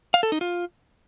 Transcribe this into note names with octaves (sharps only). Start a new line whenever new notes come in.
F5
A4
D#4
F4